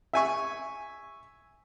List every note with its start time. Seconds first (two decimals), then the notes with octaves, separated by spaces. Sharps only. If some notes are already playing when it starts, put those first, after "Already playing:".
0.13 E5 G#5 C#6